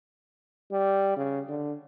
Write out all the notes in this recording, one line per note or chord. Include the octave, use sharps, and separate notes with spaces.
G3
C#3
D3